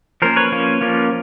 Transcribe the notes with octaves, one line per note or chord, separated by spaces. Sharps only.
F3 A#3 C#4 A#4 C5
B4 C#5
F3 A#3 C#4
F3 A#3 C#4